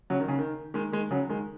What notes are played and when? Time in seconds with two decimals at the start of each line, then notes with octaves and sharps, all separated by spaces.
0.10 C#3 F#3
0.20 D#3
0.28 C#3
0.39 D#3
0.74 D#3 G#3
0.92 D#3 G#3
1.11 C#3 F#3
1.29 D#3 G#3